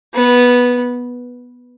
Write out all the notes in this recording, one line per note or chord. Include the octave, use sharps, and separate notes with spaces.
B3